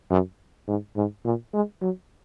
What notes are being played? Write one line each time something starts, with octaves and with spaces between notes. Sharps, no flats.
F#2
G#2
G#2
A#2
G#3
F#3